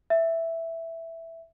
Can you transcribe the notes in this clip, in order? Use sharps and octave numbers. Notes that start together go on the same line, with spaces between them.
E5